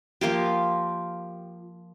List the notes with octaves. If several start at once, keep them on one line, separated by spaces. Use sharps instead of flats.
F3 A#3 F4 G4